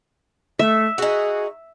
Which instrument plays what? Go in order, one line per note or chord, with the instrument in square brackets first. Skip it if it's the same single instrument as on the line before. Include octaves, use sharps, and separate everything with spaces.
[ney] A3 [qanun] E5
[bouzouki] D#4 F#4 [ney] G#4